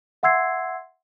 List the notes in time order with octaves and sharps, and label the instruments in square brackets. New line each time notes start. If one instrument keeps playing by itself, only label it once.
[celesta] E5 F#5 C6 E6 G#6 C7